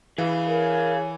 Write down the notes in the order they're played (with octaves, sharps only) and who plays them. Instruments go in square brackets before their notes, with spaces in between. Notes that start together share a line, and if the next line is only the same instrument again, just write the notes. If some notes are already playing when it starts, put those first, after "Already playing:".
[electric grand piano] E3 [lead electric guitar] G#4 F5
[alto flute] A#4 [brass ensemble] C#5 G#5